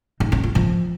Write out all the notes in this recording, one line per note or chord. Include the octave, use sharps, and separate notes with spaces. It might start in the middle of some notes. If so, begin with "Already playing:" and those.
D#4
C#4
F4
F3